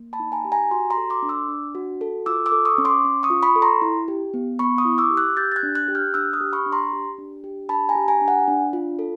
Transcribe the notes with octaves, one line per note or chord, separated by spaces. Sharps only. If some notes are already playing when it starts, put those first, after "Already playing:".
Already playing: A#3
A5 B5
D#4
G#5 A#5
G4
G#5 A#5
F#4 A#5 C6
A#5 C6
A4
C6 D6
D4
D6 E6
D4
F#4
A4
F4 D6 E6
D6 E6
A4
C#6 D#6
C#4
C6 D6
C#4
C#6 D#6
F4
B5 C#6
A4
A#5 C6
E4
G4
B3
B3 B5 C#6
C#6 D#6
E4
D6 E6
G4
E6 F#6
G4 G6 A6
A6
F#6 G#6
D4
F#6 G#6
G4
F6 G6
D4 E6 F#6
D#6 F6
G4
B5 C#6
D4
A#5 C6
G4
D4
G4
D4 A5 B5
G#5 A#5
G4
G#5 A#5
D4
F#5 G#5
D4
F4
A4